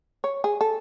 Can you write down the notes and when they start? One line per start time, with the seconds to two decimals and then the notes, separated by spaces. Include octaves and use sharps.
0.24 C#5
0.44 G#4
0.61 A4